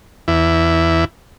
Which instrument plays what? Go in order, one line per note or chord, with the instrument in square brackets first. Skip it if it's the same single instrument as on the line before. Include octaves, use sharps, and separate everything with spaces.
[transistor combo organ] E2 E4